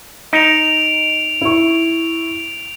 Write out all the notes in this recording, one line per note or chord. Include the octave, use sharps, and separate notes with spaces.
D#4 D7 F7
E4 C#6